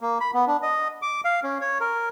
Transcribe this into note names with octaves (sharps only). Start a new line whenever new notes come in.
A#3
B5
B3
D4
D#5
D6
F5
C#4
C#5
A#4